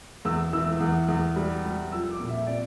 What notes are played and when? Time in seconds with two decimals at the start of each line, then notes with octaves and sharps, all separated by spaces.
0.25 E2 E6
0.53 E3 E6
0.80 E2
1.08 E2
1.36 G3
1.64 G3
1.92 F3 E6
2.11 D6
2.20 A#2
2.29 E5
2.47 C3 D5